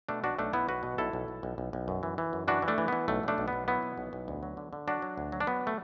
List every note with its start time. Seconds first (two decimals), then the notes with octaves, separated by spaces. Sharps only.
0.09 B2 A3 D4
0.23 B1 D4 F#4
0.39 B1 A3 D4
0.53 B1 B3 E4
0.68 B1 F#4 B4
0.83 B2
0.98 B1 E4 A4
1.13 B1
1.28 B1
1.43 B1
1.58 B1
1.73 B1
1.88 F#2
2.03 E3
2.18 E3
2.33 F#2
2.48 E3 D4 F#4
2.62 E3
2.68 A3 D4
2.78 E3
2.88 E3 B3
3.08 B1 A3
3.23 B1 A3 D4
3.38 B1
3.48 B3
3.53 B1
3.68 F#3 B3 E4
3.83 B2
3.98 B1
4.13 B1
4.28 D2
4.43 F#3
4.57 D3
4.73 D3
4.88 F#3 D4 F#4
5.02 F#3
5.18 D2
5.32 F#3
5.40 D4
5.47 F#3 B3
5.67 A3